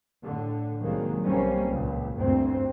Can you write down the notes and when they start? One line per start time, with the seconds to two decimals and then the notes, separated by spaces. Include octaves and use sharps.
0.22 A2 D3
0.79 C2 D#3 F#3 G#3 A#3
1.24 B1 G3 A#3 C4 C#4
1.69 C#2 A#2
2.15 G1 D2 C4